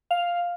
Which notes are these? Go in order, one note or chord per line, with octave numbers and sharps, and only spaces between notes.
F5